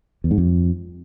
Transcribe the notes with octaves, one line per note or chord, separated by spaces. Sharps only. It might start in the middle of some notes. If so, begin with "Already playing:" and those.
E2
G#2
F2